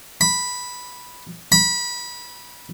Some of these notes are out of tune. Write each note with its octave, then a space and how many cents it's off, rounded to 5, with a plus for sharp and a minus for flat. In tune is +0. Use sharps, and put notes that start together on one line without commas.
B5 -5
B5 -20